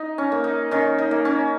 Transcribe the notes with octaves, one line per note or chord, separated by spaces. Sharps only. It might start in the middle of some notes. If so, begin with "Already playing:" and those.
Already playing: D#4
C#4
A#3
D#4
D#3 C#4
D#4
A#3
C#4